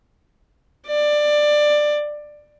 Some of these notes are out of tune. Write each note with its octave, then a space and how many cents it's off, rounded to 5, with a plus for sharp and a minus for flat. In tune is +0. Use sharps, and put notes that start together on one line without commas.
D5 +15